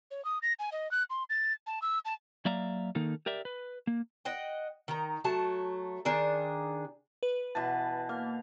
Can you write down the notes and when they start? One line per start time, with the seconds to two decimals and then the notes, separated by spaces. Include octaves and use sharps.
0.11 C#5
0.25 D#6
0.42 A#6
0.59 G#5
0.72 D#5
0.91 F#6
1.10 C6
1.30 A6
1.67 A5
1.82 E6
2.05 A5
2.45 F#3 A#3 D5 E5 F5 A#5
2.95 D#3 A#3 D#4 A4 A#4
3.26 G4 A#4 D5 E5
3.45 B4
3.87 A#3
4.25 D#5 F#5 G5
4.88 D#3 A#5
5.24 F#3 A3 A5
6.05 D#3 D4 G#4
7.23 B4
7.55 B2 E3 A5
8.09 A#3 F5